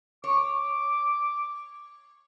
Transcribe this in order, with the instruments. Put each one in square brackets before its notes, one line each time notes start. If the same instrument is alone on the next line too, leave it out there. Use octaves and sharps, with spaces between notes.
[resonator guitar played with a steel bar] C#5 [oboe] D6